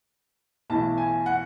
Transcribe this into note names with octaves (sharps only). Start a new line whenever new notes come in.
B1 A2 E3 A5
G#5
F#5